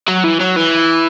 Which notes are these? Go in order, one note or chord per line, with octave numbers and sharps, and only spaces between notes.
F#3
E3
F#3
E3